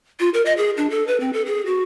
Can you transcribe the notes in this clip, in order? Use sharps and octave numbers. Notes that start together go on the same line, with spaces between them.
F4
A#4
D#5
G#4
D4
A4
B4
C4
A4
G#4
F#4